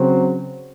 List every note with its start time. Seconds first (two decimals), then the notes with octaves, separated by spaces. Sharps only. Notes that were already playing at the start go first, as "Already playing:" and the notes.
Already playing: C#3 F#3 C4